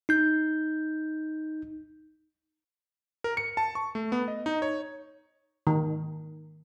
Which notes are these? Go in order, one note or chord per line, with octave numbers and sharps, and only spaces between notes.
D#4 G6
A#4
C#7
A5
C#6
A3
B3
D#5
D#4
C#5
D#3